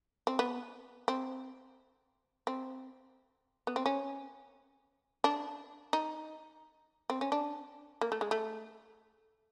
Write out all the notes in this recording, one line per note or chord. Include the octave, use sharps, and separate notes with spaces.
C4
B3
C4
C4
B3
C4
C#4
D4
D#4
C4
C#4
D4
A#3
A3
G#3
A3